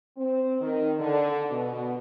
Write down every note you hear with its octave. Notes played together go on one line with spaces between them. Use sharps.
C4
D#3
D3
B2